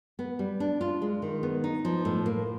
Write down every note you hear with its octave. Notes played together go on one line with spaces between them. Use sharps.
B3
G3
D4
F4
G#3
D#3
B3
D#4
F3
A2
A#3